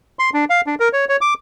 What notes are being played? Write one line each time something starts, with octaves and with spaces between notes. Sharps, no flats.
C6
D4
F5
D4
A#4
C#5
C#5
D6